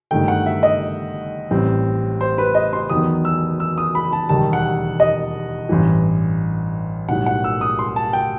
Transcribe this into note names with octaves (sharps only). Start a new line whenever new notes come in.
G1 G2 D#3 A3 G5
F#5
E5
D#5
A1 A2 G3 C4
C5
B4
D#5
C6
E2 D#3 F#3 B3 D#6
E6
E6
D#6
B5
A5
E1 D#2 D#3 G3 A5
F#5
D#5
A1 G2 E3
B1 A2 G3 F#5
F#5
E6
D#6
C6
A5
G5